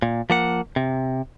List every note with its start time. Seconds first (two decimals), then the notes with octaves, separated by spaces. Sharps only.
0.02 A#2
0.30 F3 A#3 F#5
0.76 C3